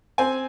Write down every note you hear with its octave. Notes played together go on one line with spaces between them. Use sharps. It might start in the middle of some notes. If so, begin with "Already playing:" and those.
C4 G#5